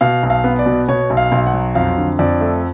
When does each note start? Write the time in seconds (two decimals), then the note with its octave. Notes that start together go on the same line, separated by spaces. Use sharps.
0.01 B2 F5
0.23 B1
0.30 F5
0.44 B3
0.59 D5
0.66 B2
0.88 B2 C#5
1.10 B1
1.17 F5
1.32 B1
1.46 F#5
1.54 F#3
1.75 F2 F5
1.97 D3
2.19 F2 D5
2.41 A3